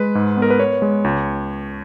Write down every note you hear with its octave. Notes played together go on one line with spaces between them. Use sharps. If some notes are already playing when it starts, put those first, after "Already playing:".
Already playing: G#3 B4
G#2
B3
A#4
B4
B3 C#5
G#3
C#2